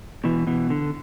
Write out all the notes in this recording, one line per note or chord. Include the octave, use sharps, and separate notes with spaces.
B2 E3
B2 E3
D3